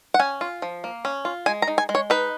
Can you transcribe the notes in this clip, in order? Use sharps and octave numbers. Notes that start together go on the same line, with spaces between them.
F#5
C#4 G#5
F4
F3
A#3
C#4
F4
G#3 G#5
A#5
D#4
G#5
G#3
C#5
D#4 B4